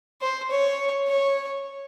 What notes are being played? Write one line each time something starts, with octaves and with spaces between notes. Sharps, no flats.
C5
C#5
C#5